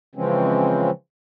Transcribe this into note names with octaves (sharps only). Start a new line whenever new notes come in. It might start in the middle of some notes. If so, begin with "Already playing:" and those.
C#3 E3 F3 G#3 C4 C#4